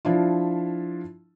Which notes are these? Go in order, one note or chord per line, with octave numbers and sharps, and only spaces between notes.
F3 D4 E4 F4